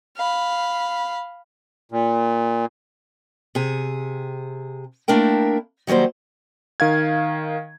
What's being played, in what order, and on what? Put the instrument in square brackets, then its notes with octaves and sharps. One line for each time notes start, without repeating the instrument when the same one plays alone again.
[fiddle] F5 B5
[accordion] A#2
[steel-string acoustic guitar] C3 G#4
A3 A#3 D4 E4 A#4 G5
D#3 F#3 G3 A#3 C5
[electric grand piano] D#3 F5 G#6